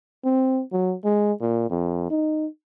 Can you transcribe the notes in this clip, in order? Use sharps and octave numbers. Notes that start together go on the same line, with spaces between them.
C4
F#3
G#3
A#2
F2
D#4